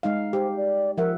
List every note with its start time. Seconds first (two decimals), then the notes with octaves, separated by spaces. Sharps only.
0.03 G#3 D#4 F5
0.33 G4 C5
0.57 D5
0.98 F3 A#4 E5 F#5